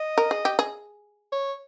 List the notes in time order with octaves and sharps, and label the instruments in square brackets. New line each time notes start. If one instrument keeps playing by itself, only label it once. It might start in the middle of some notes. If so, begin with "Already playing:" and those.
Already playing: [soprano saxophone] D#5
[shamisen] A#4
G#4
G4
G#4
[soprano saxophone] C#5